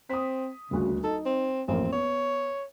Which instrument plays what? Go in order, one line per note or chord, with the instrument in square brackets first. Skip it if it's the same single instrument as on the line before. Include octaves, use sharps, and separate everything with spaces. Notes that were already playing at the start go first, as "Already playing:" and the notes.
[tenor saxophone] C4 [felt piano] D#6 B6
[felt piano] D#1 D2 F#4 [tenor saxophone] C#3
[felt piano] D#4 [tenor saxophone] A4
[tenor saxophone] C4
[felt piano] A1 F2 A#3 [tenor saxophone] C4
[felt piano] B3 [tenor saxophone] C#5